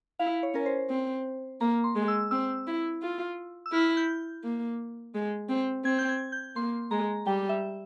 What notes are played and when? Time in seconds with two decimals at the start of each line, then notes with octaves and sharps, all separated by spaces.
0.19 E4 F5
0.43 C#5
0.54 C#4 A#4
0.66 C5
0.90 C4
1.61 A#3 A#5
1.84 C6
1.96 G#3
2.08 E6
2.31 C4 E6
2.67 E4
3.02 F4
3.66 E6
3.73 E4 F6
3.97 G6
4.44 A#3
5.15 G#3
5.49 C4
5.85 C4 G#6
5.99 G6
6.09 G#6
6.32 G6
6.56 A#3 C6
6.91 G#3 A#5
7.26 G3 G5
7.49 E5